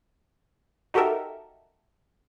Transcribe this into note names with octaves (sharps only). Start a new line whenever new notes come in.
D#4 F#4 G4 A4 A#4 E5